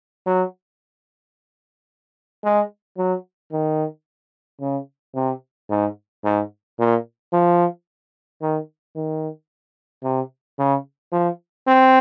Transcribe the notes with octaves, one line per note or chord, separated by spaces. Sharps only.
F#3
G#3
F#3
D#3
C#3
C3
G#2
G#2
A#2
F3
D#3
D#3
C3
C#3
F3
C4